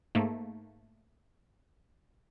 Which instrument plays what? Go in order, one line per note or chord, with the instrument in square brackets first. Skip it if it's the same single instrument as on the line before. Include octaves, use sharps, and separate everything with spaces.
[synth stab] G#2 A3 A#3